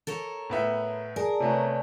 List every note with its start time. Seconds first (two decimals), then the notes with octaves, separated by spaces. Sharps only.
0.07 A4 A#4 C#5
0.50 A2 B3 E5
1.16 G#4 A#4 D5 G#5 A5
1.40 C3 A3 B3 C#5